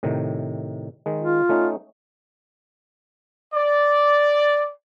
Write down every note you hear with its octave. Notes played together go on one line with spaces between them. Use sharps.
A2 C3 D#3
D#3 G#3
F4
A3 C#4 D#4
D5